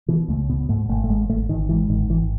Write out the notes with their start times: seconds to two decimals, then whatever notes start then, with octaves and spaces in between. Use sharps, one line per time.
0.08 B2 E3
0.28 C#2 A3
0.49 B2 B3
0.69 G#2 A3
0.89 G#1 A3
1.04 A3
1.09 G#1 G#3
1.29 G#1 A3
1.49 G#1 D#3
1.69 G#2 E3
1.90 G#1 D#3
2.09 G#1 E3